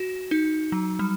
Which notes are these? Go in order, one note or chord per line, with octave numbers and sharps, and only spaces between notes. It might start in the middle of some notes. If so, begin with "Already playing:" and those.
Already playing: F#4
D#4
F#3
G3